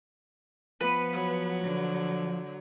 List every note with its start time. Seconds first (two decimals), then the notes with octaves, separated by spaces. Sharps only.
0.81 F3 B3 B4
1.13 F#3
1.63 D3